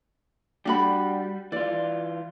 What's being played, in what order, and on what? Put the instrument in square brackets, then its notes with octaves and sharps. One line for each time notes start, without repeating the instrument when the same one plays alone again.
[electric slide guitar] G3 [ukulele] D4 F#4 B5
[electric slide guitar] E3 F4 [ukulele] D5